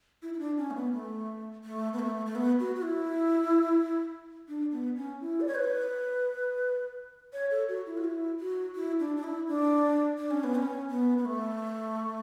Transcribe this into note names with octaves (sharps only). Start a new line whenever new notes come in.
E4
E4
D4
C#4
A3
B3
A3
A3
B3
A3
A3
B3
F#4
F#4
E4
D4
B3
C#4
E4
D5
C#5
B4
C#5
A4
F#4
E4
F#4
E4
F#4
E4
D4
D4
E4
D4
D4
C#4
B3
C#4
B3
B3
A3